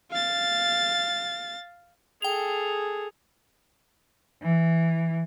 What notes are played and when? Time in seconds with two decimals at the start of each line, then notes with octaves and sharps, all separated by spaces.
0.11 F5 A6
2.22 G#4 A4 G5 F7
4.42 E3